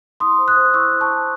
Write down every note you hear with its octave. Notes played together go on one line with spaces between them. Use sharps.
E4 C6 D#6
C5
D#6 F#6
C5
E4 C#6 E6
E4
A5 C#6
C5